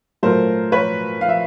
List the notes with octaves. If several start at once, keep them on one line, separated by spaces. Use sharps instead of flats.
A#2 F#3 A3 A#4 C5
B4 C#5
F5
E5